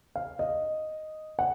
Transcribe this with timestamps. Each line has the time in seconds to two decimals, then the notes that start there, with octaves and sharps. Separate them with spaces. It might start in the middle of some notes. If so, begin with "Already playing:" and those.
0.16 F5
0.39 D#5
1.39 F#5